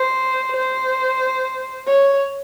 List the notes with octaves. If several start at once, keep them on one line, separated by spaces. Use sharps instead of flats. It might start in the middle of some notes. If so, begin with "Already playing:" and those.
Already playing: C5
C5
C#5